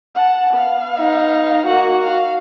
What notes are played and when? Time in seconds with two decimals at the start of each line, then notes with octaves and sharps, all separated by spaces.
0.15 F#5 A5
0.53 B3 F5
0.98 D#4
1.66 A#3 F#4 F#5
2.01 F5